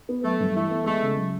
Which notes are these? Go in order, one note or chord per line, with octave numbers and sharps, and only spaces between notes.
B3
F#3 A3
G2
E3 A3
B3
G#3 A3
C#3
F#3